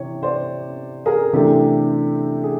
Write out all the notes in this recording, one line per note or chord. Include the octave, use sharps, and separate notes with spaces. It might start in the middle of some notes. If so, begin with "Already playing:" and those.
Already playing: C3 E3 C#5
C5 D5
G#4 A#4
C3 E3 A3 D4 G4 A4
G#4